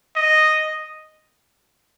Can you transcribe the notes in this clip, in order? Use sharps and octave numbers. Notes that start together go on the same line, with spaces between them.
D#5